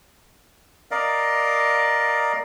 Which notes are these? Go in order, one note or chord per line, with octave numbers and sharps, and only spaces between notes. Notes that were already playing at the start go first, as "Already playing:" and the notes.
A#4 D5 D#5 F5